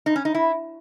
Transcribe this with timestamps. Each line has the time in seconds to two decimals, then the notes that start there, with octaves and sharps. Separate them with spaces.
0.06 D#4
0.16 C#4
0.25 D#4
0.34 E4